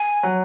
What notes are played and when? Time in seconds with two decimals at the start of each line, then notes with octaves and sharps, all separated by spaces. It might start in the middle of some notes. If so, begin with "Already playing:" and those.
Already playing: G#5
0.23 F#3